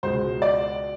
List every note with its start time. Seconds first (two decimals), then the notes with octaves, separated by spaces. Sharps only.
0.03 C#2 B2 G#3 C5
0.42 D5